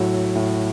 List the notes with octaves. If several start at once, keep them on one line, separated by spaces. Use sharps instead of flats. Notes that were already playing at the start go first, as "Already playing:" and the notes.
Already playing: A2 F#3 F#4
A2